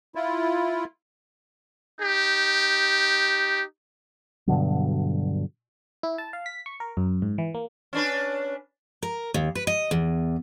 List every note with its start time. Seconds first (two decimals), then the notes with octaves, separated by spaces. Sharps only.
0.15 E4 F4
2.01 D#4 G4
4.47 G2 B2 D3 F#3
6.03 E4
6.18 A5
6.33 F5
6.46 B6
6.66 C#6
6.80 A#4
6.97 F#2
7.22 G#2
7.38 E3
7.54 A#3
7.93 C#4 D4 B4
9.03 A#4
9.34 D#2
9.55 B4
9.67 D#5
9.91 E2